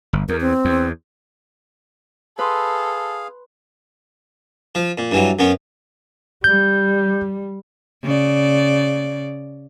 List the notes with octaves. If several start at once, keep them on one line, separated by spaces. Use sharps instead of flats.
G1
E2 A#4
C4
E2
G#4 A4 B4 F5 C6
F3
A#2
G2 E3 F#3
F#2 B3 C#4
G3 G6
C#3 D5